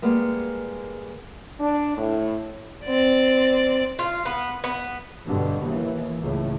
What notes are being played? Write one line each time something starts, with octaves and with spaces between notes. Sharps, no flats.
G3 G#3 A#3 B3
D4
A2
C4 D5
F4
B3
B3
G2 B2 D3
D#2 E3
C#2 A2